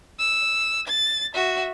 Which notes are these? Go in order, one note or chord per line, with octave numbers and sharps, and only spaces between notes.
E6
A6
F#4 E5